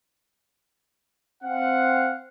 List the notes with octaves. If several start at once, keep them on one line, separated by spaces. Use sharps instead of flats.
C4 F5 F#5